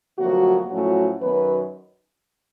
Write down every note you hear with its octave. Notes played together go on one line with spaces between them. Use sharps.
D2 C3 F3 F#3 A#3 F#4
A2 F3 F#3 A3 C#4 F#4
F#2 D#3 F#3 B3 B4